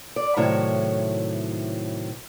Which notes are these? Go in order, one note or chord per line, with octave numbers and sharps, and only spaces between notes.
D5
A2 C3 D#3 F#3 E4 C#5